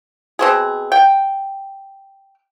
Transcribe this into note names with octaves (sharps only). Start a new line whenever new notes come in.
B2 C4 G#4
G5